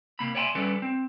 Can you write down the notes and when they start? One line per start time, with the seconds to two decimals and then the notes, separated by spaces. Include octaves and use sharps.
0.19 C3 A#3 B5
0.35 C#5 D5 E5 G5 G#5 C6
0.55 G3 C#4 A4 B4 D5
0.82 C4